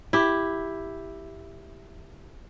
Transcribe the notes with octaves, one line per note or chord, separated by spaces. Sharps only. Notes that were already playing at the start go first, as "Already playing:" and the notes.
E4 G4